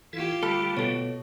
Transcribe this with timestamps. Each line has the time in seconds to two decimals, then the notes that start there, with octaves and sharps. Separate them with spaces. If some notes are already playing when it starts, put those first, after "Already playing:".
0.13 E3 E4 F4 G4 A4
0.43 D3 G3 A3 A4 B5 F6
0.77 B2 A4 C#5